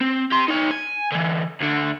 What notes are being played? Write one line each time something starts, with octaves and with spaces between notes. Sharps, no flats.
C4
G4 C6
D#4 C#5
G#5
D3 E3
D2 D3